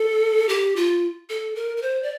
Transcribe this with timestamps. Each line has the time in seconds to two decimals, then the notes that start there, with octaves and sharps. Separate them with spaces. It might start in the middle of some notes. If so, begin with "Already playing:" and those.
Already playing: A4
0.49 G4
0.76 F4
1.29 A4
1.56 A#4
1.77 A#4
1.82 C5
2.03 D5